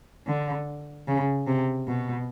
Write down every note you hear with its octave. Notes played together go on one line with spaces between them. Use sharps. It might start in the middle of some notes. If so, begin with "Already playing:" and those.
D3
C#3
C3
B2